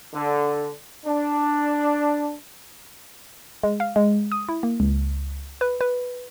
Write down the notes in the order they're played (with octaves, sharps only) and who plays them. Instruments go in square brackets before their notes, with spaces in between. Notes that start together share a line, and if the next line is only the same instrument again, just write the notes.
[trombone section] D3
D4
[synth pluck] G#3
F5
G#3
D#6
E4
A#3
C#2
B4
B4